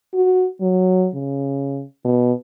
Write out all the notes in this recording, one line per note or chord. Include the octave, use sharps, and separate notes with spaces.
F#4
F#3
C#3
B2